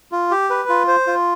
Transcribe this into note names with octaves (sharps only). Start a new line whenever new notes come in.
F4
G4
B4
F4
C5
F4